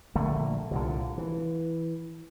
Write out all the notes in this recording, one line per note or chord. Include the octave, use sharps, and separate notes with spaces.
A#1 D3 A3 A#3
C2 A#2 D3
E3